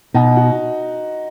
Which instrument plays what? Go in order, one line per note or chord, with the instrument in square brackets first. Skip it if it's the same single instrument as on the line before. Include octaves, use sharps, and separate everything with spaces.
[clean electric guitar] B2 [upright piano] D#4
[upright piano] F#4